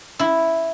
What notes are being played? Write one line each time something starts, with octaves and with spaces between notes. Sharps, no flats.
E4